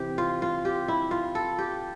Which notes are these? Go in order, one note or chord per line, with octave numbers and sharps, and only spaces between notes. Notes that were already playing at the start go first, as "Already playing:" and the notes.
Already playing: C3 E3 G4
F4
F4
G4
E4
F4
A4
G4